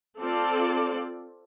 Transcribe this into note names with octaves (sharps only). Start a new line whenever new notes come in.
C4 F4 A4 D5